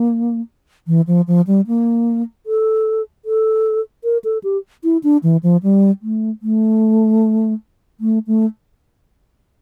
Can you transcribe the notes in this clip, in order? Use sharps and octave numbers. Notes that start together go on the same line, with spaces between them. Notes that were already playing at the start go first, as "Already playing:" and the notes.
Already playing: A#3
E3
F3
F3
G3
A#3
A4
A4
A#4
A4
G4
E4
D4
E3
F3
G3
A3
A3
A3
A3